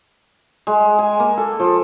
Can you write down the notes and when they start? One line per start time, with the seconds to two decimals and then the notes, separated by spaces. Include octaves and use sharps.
0.67 G#3
0.99 G#5
1.20 A#3
1.38 A4
1.60 F3